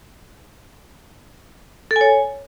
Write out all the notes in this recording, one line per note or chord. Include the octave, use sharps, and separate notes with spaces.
A4
G#5
C#5